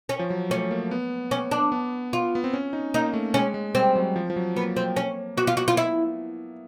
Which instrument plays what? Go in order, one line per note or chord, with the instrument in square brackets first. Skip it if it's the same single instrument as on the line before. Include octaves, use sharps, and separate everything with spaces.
[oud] C#4
[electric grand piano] F3
F#3
[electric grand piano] A3 [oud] C#4
[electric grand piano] A#3
B3
[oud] C#4
D4
[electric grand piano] B3
[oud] F4
[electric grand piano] B3
C4
C#4
D#4
[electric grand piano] A#3 [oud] D#4
[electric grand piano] A3
[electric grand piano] G#3 [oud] C#4
[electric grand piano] G#3
[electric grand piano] G3 [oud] C4
[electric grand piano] F#3
F3
F3
F#3
[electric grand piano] A#3 [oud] B3
[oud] C4
C#4
[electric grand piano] B3 [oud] F#4
[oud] F4
F#4
F4
E4